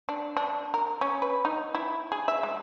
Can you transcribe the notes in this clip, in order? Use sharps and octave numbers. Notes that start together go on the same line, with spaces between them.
D4
D4
A#4
C#4
B4
D#4
E4
G#4
E5
G#3